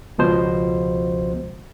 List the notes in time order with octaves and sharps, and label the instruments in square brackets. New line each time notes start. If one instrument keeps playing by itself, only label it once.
[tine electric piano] C#2 B2 F3 C5